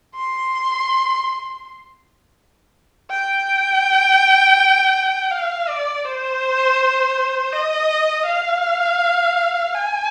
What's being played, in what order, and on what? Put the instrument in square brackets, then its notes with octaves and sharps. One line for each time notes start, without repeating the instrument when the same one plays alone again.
[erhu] C6
G5
F5
D5
C5
D#5
F5
G#5